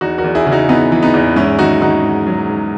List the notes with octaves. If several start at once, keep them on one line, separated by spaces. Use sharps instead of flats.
E2 D#4 F#4
F#4 A#4
E2
E4 G#4
C#3
D#4 F#4
E3 B3 D#4
E3
B3 D#4
E2
G#2 C#4 E4
D#3 D#4 F#4
D#3 D#4 F#4
G#2
F#3
G#2